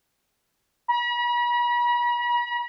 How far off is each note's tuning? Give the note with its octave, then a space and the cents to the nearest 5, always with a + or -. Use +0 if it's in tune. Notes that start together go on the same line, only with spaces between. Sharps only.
B5 -45